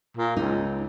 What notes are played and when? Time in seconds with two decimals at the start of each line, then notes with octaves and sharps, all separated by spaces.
0.17 A#2
0.37 C#2 D#4